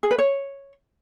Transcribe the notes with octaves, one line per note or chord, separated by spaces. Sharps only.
G#4
B4
C#5